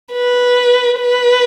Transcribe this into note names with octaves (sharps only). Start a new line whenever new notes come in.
B4
B4